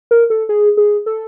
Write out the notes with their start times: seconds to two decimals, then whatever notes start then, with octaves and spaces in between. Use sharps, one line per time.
0.11 A#4
0.30 A4
0.49 G#4
0.77 G#4
1.06 A4